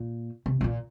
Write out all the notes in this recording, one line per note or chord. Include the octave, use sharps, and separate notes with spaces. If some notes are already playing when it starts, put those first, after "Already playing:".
Already playing: A#2
C3
B2
A#2